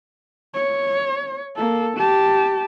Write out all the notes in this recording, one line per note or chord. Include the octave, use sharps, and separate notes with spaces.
C#5
A#3 A4
G4 A5